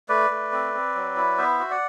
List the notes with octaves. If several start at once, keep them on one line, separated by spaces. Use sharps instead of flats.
A3 B4 D5
A3
C4
C4
F#3
E4
B3 C5 E5
F#4
D5 F#5